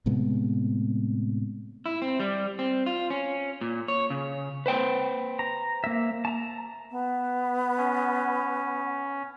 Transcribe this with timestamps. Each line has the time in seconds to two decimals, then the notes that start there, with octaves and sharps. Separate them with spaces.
0.06 A2 C3 G#3 B3
1.86 E4
2.02 C4
2.20 G3
2.59 C4
2.86 F4
3.10 C#4
3.61 A#2
3.88 C#5
4.10 C#3
4.66 B4 C5 G5
5.39 A#5
5.84 A#3 E5
6.25 A5 A#5
6.91 B3
7.78 C#4